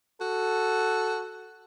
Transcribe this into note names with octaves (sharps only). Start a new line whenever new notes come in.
F#4 A4